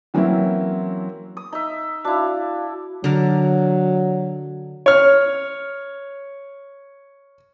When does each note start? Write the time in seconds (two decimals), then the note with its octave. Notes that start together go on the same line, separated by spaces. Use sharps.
0.14 E3 F#3 A#3 C4 C#4 E4
1.37 D#6
1.52 D#4 E5
2.05 D4 E4 F#4 F5
3.04 D3 F#3 A#4
4.86 C#5 F6